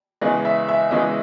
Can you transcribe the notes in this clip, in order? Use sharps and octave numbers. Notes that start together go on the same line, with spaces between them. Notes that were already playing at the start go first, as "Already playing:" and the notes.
E2 C#3 E3 G#3 D#5
E5
E5
E2 C#3 E3 G#3 D#5